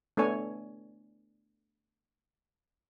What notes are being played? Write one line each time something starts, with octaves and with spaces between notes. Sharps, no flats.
A3 B3 D4 A4 C#5 G#5